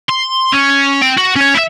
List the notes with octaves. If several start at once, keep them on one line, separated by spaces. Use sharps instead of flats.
C6
C#4
C4 G5
F#4
C#4 C#5
E4 E5